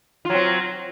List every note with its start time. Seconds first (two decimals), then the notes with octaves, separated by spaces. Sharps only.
0.25 F4
0.30 F#3
0.34 C4